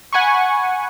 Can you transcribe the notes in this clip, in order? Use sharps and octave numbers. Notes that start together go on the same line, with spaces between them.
F#5 G#5 B5 C#6